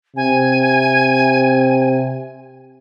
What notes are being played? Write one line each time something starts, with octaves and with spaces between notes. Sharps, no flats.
C3 G#5